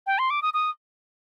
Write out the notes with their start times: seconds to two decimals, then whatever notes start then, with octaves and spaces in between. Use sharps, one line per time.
0.07 G5
0.19 C6
0.30 D6
0.42 D#6
0.54 D#6